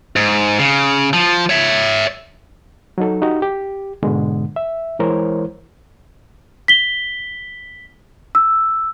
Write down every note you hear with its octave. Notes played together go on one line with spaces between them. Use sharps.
G#2
C#3
F3
C#5 E5
F#3 D#4 A4
D#4 F#4 G4
G4
G#2 B2 D3 G#3
E5
E3 G#3 E4 A#4 C5 C#5
B6 G7
E6